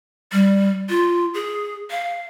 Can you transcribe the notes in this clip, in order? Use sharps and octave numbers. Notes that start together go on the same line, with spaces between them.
G3
F4
G#4
F5